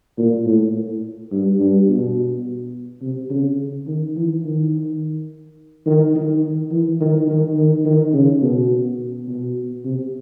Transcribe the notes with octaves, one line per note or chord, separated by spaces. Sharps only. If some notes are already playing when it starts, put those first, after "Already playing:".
A#2
A2
G2
G2
B2
C3
C#3
D#3
E3
D#3
D#3
D#3
E3
D#3
D#3
D#3
D#3
C#3
B2
B2
C3